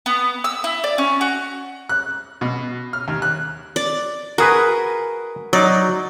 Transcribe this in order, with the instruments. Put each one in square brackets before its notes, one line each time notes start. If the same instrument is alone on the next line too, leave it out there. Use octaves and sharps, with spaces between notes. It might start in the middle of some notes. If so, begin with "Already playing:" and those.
[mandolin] B3
E6
E4
D5
C#4
F#4
[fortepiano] F#6
B2
F6
D#2
F#6
[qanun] D5
[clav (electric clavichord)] F#4 G#4 B4 [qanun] A#4
[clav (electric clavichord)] F#3 D#4 [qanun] D5